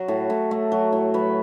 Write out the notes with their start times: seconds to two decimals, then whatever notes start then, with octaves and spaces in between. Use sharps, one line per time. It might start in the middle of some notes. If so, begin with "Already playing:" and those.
Already playing: F#3 F#4
0.08 A2
0.30 A2
0.51 A3
0.72 F#3
0.92 A2
1.14 F#3 B4